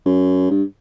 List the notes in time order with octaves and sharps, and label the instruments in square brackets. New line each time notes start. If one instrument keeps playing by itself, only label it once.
[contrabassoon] F#2
G2